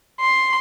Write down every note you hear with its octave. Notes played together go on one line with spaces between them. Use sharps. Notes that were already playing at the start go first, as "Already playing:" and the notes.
C6